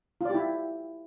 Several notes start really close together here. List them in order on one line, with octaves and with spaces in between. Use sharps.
F4 D5 G4 E4